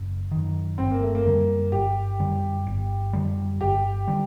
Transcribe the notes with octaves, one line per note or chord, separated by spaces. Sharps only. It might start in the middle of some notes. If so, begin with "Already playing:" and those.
Already playing: F#1
F#2 D#3
G1 C4
A#3
A3
A#3
F#2 D3 G3
G1 G4
F#2 D3 G3
G1
F#2 D3 G3
G1 G4
D3 G3